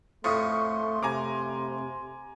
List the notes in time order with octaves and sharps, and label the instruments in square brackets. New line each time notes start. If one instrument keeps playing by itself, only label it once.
[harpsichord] F2 A2 [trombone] A3 [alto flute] C6 [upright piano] C#6 D#6
[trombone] C3 [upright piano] G#5 A#5 D6